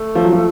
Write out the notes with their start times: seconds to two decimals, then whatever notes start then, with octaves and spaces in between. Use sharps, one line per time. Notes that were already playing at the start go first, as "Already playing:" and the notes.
Already playing: A3
0.15 F3
0.24 F#3
0.32 F3